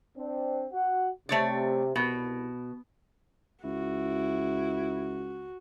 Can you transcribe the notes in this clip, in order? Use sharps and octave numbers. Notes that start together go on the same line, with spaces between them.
C4 D4
F#4 F#5
C3 A3 C#5 D5
C2 B2
C#2 E4 F#4